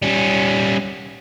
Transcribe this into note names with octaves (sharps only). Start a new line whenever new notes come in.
G3 C#4